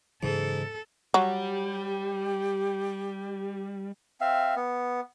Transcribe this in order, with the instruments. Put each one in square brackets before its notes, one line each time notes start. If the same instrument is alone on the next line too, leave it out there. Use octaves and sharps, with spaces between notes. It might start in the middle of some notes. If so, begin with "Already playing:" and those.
[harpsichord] G#2 [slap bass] C#3 E3 F#3 [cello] A4
[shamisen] F#3 [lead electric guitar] G3 [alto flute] G4
[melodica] C4 E5 F5
B3